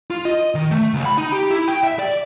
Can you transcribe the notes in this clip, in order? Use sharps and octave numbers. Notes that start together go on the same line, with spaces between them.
F4
D#5
D#3
A3
C#2
B5
D#4
G4
E4
G5
E5
D5